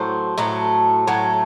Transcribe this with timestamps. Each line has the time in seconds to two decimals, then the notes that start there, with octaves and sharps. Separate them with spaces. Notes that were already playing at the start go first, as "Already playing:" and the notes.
Already playing: A2 F#3 A3 C5
0.38 A2 F#3 A3
1.08 A2 F#3 A3